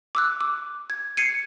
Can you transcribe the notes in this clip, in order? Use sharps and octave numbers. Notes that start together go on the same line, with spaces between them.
D6 E6 F#6
D6
G#6
G#6 C7 C#7 D#7